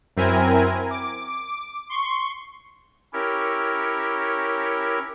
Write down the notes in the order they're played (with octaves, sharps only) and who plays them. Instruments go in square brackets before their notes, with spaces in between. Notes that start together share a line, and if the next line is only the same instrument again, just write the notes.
[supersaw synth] F#2 C4 E4 A#4 G#5
D6
C6 C#6
[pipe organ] C#4 E4 G4 A#4 C#5